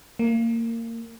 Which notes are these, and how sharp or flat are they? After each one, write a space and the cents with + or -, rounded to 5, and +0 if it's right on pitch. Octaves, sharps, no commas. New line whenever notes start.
A#3 -25